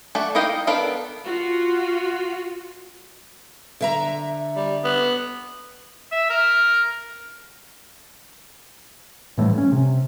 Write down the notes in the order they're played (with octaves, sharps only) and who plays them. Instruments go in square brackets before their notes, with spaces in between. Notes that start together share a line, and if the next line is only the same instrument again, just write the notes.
[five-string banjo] A3 D4 F#4
D#4 E4 D#5 F5 G5
B3 D4 A4 A#4 F5
[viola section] F4 F#4
[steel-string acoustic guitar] D3 E5 A#5
[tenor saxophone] G3
B3
[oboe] E5
A#4
[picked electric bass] A2 E3 G3 A3
C#4
C3